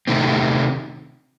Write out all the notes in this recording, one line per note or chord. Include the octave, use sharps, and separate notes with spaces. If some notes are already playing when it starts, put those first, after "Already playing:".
C3 D#3 A3 C4